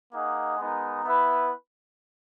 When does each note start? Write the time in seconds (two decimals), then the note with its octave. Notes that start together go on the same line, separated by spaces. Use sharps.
0.12 A#3 D#4 G#4 D#5 F#5
0.58 G#3 B3 D#4 A#4
1.05 B3 E4 B4 E5